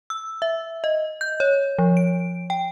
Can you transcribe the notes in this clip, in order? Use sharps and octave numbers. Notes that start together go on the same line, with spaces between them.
E6
E5
D#5
G6
C#5
F3
D7
G5